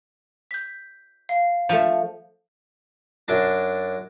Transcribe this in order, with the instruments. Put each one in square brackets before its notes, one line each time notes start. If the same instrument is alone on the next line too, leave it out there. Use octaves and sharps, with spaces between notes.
[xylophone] G6 B6
F5
[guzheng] F3 A3
[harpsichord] F#2 D4 A5